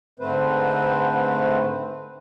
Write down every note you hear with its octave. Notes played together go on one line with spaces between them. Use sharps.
G#2 D3 A3 C4 B4 C5